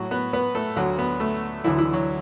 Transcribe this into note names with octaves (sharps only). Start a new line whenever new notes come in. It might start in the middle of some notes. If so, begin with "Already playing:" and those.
Already playing: A2 F#3 F#4
B3 B4
B3 B4
A3 A4
D2 D3 F#3 F#4
B3
A3
D2 D3 E3 F#3 E4
E3 E4
F#3 F#4